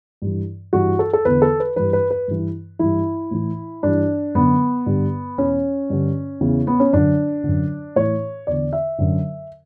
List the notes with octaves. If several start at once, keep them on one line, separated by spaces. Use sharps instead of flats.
G2 E3
G2 E3 F#4
A4
A4
E2 D3 B4
A4
B4
G2 E3 B4
B4
B4
G2 E3
G2 E3 E4
A2 E3
G2 E3 D4
F#2 D3 B3
G2 D3
E2 B2 C#4
G2 D3
E2 C#3 E3
B3
C#4
F#2 D3 D4
F#2 D3
A2 E3 C#5
E2 D3 D5
E5
F#2 D3